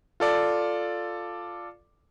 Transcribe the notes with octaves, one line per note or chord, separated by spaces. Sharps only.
F4 A4 D5